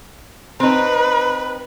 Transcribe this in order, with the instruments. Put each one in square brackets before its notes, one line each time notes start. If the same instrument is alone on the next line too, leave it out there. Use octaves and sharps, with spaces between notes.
[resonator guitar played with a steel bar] C4 D#4 [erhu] B4